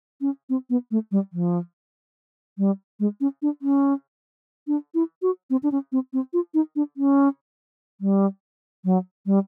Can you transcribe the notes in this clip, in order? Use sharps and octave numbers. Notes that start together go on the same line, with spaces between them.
C#4
C4
B3
A3
G3
F3
G3
G#3
C#4
D4
C#4
D4
E4
F#4
C4
D4
C#4
C4
C4
F4
D#4
D4
C#4
G3
F#3
G3